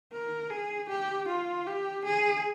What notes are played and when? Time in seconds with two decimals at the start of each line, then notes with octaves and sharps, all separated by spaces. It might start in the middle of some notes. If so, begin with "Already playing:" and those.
0.13 A#4
0.50 G#4
0.89 G4
1.28 F4
1.66 G4
2.06 G#4